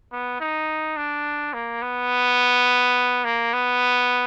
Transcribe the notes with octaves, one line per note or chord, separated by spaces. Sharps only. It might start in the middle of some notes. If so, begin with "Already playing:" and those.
B3
D#4
D4
A#3
B3
A#3
B3